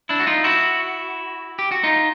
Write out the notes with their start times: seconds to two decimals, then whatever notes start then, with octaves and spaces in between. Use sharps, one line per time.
0.09 D4 E4
0.20 F#4
0.27 D#4 F4
0.44 E4 F#4
1.59 G4
1.72 F#4
1.84 D#4 F4